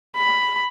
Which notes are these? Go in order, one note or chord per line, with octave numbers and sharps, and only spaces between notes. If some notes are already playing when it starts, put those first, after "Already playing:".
B5